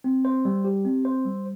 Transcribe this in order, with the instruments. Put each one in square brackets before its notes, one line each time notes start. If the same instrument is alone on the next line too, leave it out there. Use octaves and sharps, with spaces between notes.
[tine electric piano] C4
C5
G3
G4
C4
C5
G3